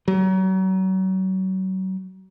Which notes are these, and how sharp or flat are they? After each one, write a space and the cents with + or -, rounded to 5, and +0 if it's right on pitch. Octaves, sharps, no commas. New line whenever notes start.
F#3 +35